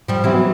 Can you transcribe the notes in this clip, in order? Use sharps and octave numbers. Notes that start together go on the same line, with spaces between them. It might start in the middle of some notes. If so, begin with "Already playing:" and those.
F3 G3
C3 E3 F#3
B2